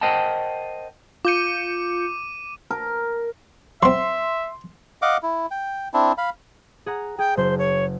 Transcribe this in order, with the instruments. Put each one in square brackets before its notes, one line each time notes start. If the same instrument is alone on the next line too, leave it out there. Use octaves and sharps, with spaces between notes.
[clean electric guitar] A#4 C5 D#5 F#5 G5 A5
[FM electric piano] F4 G6 C#7 [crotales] D6 D#7
[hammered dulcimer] A#4
[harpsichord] F#3 C4 [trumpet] E5 [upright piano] C6
[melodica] D#5 F5 F#5 D6
E4
G5
C4 D4 E4
F5 B5
[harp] G#4 F#5 A#5
[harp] G#4 [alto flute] G5
[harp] F#1 [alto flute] C5
[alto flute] C#5